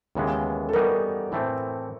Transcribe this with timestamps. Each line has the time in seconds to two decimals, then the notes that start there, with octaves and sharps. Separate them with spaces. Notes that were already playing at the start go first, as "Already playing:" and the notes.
0.15 D#2 C#3 E3 G#3 B3
0.69 A4
0.73 E3 G3 B3 D#4 F#4 A#4
1.32 A2 E3 A3 C4